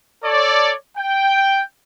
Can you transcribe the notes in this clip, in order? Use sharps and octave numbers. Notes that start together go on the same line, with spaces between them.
A4 C#5 D5
G5